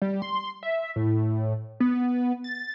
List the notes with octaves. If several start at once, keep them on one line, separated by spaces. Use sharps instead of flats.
G3
C6
E5
A2
B3
A6